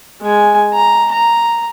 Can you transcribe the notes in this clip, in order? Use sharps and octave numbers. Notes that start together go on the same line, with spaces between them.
G#3 G#5
A#5
A#5